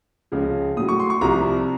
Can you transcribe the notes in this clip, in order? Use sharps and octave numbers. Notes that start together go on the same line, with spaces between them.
C#2 C#3 F3
A2 F#3 D#6
C#6
C6
C#6
C2 C3 F3 A#5